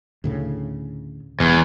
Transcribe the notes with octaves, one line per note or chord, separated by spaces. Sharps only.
D2 A2 C#3
E1 E2